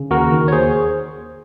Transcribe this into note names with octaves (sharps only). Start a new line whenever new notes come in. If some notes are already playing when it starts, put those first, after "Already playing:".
Already playing: C#3
D#2 F#4 A#4
D#3
C#5
D#2 G#4 C5